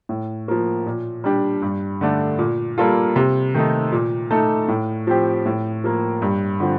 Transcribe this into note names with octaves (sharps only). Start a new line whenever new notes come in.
A2
F3 A#3
A#2
G3 D4 G4
G2
D3 A3 D4
A#2
G3 A#3 F4 A4
C3
D#3 A3 D#4
A#2
A3 D#4 A4
A2
F3 C4 G4
A2
F3 A#3
G2
D3 F3 C4